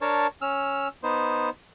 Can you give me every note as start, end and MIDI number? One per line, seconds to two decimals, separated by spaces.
0.01 0.27 62
0.01 0.27 70
0.01 0.27 73
0.01 0.27 81
0.42 0.88 61
0.42 0.88 88
0.42 0.88 89
1.03 1.50 59
1.03 1.50 63
1.03 1.50 72